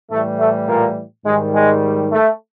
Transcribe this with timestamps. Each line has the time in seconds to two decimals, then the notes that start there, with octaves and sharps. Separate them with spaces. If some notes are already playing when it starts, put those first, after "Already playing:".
0.11 A2 E3 G3 A3
0.39 A3
0.68 A#2 A#3
1.25 G#2 D#3 G3 G#3
1.53 G#3
2.11 A3